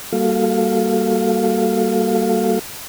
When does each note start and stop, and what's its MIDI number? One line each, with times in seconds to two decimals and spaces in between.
0.13 2.59 55
0.13 2.59 58
0.13 2.59 66
0.13 2.59 69
0.13 2.59 77